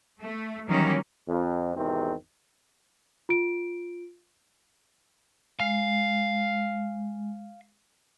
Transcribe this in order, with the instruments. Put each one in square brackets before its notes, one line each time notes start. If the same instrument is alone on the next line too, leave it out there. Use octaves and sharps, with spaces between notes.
[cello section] A3
D#3 E3 F#3 G3 A#3 C#4
[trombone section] F2
G#1 E2 C3 D#3 C4
[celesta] F4 D7
[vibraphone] G#3 [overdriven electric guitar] F5